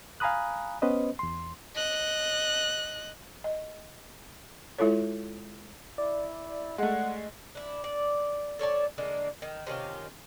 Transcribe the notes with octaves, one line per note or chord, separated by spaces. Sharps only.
F5 G#5 A#5 B5 D#6 F#6
B3 C#4 B4 C5 D#5
E2 C6
D#5 F#6
D#5
G#3 E4 F4 A4 C#5
E4 D5
G#3 A3 F#5
D4 E4
D5
A4 C#5 D5 A5
D3 G#3 A#3
D#3
C3 D#3 C#4 F4